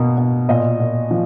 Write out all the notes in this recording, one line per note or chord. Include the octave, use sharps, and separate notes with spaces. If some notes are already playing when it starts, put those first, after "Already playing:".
Already playing: B2 A#3
B2
A#2 D#5
A#2
F3